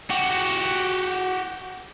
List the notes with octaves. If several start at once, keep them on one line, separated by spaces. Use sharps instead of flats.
F#4 G4